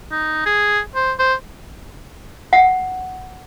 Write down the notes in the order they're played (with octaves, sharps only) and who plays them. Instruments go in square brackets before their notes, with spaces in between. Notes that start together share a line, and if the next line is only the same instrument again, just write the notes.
[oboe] D#4
G#4
C5
C5
[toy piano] F#5